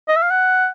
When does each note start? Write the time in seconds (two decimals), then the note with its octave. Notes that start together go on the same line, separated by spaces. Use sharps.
0.08 D#5
0.16 E5
0.23 F5
0.30 F#5